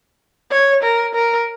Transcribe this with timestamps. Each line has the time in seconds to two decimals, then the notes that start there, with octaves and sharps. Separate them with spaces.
0.51 C#5
0.83 A#4
1.15 A#4